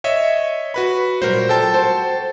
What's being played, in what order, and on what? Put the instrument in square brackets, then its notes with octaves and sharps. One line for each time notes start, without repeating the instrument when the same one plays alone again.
[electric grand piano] C#5 D#5 E5
F#4 B4 B5
[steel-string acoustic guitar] A#2 F#3 G3 [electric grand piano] A#4 C5
[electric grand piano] A4 G5 A5
[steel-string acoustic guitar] F#4 C5